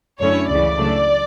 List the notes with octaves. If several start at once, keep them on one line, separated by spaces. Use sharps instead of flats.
F#2 D3 A3 C#4 E4 C#5
C#2 C#3 E3 D5
C#2 C#3 F#3 A3 D4